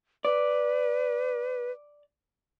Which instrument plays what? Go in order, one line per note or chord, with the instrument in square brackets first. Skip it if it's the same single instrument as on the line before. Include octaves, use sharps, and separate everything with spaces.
[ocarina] B4 [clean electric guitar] D5